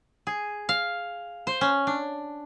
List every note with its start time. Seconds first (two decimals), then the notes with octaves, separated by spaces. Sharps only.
0.27 G#4
0.69 F5
1.47 C5
1.61 C#4
1.87 D4